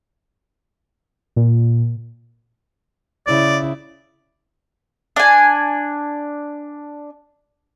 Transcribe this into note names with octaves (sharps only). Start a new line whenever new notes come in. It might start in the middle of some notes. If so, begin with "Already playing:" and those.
A#2
C#3 E4 D5
D4 G#5